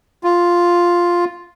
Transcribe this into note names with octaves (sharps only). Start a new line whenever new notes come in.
F4